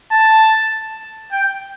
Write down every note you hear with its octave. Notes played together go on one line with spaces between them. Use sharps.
A5
G5